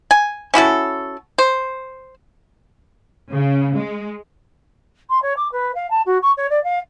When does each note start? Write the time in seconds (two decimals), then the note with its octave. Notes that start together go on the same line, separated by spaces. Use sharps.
0.11 G#5
0.54 C#4 E4 F#4 A4
1.38 C5
3.33 C#3
3.75 G#3
5.10 C6
5.23 C#5
5.37 D6
5.52 B4
5.75 F5
5.91 A5
6.06 F#4
6.22 C#6
6.37 C#5
6.50 D5
6.64 F5